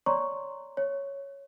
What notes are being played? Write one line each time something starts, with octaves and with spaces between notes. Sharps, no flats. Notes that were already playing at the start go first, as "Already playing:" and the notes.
C#5 D5 A#5 C6 C#6
C#5